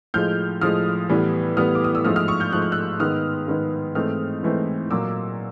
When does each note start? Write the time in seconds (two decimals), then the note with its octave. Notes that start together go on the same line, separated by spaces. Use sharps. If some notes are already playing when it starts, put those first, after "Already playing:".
0.14 A2 F3 G#3 F6 G6
0.61 A2 F3 G#3 D#6 F6
1.09 A2 E3 G3 B3
1.57 A2 E3 G3 B3 D#6 F6
1.75 D6
1.84 D#6
1.95 E6
2.05 G#2 F3 A3 D#6 F6
2.16 D#6 F6
2.28 C#6 D#6
2.40 F6 G6
2.52 G#2 F3 A3 F#6
2.62 G6
2.72 E6 F#6
3.00 G#2 D#3 G#3 B3 D#6 F6
3.48 G#2 D#3 G#3 B3
3.95 G#2 E3 A3 C4 D#6 F6
4.43 G#2 E3 A3 C4
4.90 A#2 F#3 A#3 D6 E6